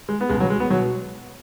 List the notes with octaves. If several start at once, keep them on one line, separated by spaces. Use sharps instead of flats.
G#3
B3
C#2 B2 G#3
F#3
G#3
B3
B2 F#3